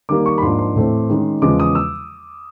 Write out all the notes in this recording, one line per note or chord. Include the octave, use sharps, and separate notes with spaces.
D#3 G3 A#3 D6
C#6
B5
G#2 F3 A#3 D4 C6
C6
A2 E3 A3 C4
D#3 G#3 C#4
E2 C#3 F3 G#3 B3 D6
D#6
E6